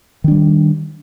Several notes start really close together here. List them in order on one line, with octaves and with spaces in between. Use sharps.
D#3 D4 G3